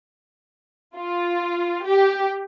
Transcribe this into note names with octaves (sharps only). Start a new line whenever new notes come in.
F4
G4